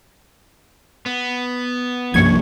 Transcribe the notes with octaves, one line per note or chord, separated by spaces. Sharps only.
B3
C2 G2 F3 A#3 C#6 G#6